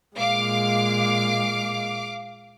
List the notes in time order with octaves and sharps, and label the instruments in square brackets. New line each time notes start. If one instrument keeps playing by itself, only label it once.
[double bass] A#2 G#3 [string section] F5 D6